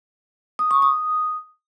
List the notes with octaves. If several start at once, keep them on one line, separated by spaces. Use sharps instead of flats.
D#6
C#6
D#6